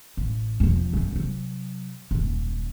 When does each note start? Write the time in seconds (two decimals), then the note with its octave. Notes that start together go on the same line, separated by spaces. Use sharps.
0.17 A1
0.60 E1 F3
0.93 F#2 C#4
1.13 C3 F#3
2.11 D#1 F#2